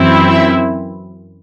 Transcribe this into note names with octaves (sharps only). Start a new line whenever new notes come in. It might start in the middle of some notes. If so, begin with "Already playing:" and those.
Already playing: F#2 E3 C4 E4
E5